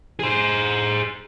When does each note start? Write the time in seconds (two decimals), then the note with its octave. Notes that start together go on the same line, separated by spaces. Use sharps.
0.19 G#4 C5